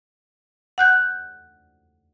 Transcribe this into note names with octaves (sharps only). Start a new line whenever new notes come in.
F#5 F#6 G6